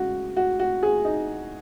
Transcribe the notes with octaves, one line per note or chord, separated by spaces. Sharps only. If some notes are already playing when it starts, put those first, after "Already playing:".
Already playing: C#3 G#3 F#4
F#4
F#4
G#4
D#4